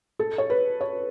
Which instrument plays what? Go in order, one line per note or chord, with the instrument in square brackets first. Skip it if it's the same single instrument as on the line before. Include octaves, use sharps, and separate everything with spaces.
[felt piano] A4
C#5
B4
C#5